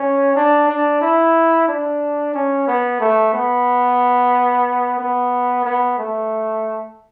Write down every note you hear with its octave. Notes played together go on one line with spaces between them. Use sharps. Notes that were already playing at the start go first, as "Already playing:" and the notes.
Already playing: C#4
D4
D4
E4
D4
C#4
B3
A3
B3
B3
B3
A3